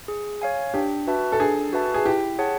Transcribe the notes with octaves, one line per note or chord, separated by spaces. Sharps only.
G#4
C#5 F5 G#5
D4 G4
F#4 B4 E5 A5
A4
D4 G#4
F#4 B4 E5 A5
G#4
E4 G4
G#4 C#5 F#5 A5